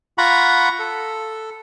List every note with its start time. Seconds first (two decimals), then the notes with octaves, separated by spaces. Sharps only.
0.18 F4 F#5 A#5 B5 C#6
0.79 A4